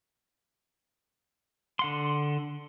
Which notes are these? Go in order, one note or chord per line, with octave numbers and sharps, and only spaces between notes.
D3 F#5 C6